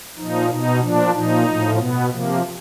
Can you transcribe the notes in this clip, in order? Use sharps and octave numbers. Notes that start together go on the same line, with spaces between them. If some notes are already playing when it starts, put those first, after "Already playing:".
A#2 F3 D#4
B2 D#4
A#2 F3 D4
A#2 F3 D#4
A2 F3
B2 B3
C3 F3 A#3